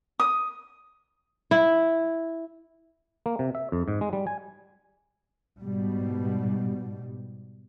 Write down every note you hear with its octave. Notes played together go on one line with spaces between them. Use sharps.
D#6
E4
A#3
C3
E5
F2
G#2
G#3
G3
G#5
G#2 B2 G3